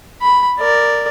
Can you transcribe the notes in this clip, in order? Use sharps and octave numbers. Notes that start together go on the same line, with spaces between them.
B5
A#4 D5